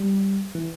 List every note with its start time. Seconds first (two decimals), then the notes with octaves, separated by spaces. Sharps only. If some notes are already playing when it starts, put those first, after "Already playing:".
Already playing: G3
0.55 E3